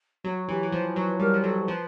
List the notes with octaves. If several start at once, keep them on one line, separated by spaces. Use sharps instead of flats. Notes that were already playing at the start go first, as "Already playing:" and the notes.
F#3 F#4
E3 G4
E3
F3 C5
F#3 B4
G3 A#4
F3
F#3 A4
F3 B4